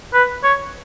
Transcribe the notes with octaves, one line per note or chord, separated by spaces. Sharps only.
B4
C#5